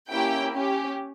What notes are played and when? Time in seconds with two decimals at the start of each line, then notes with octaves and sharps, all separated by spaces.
0.11 A#3 C#4 E4 G4 G5
0.54 C#4 G4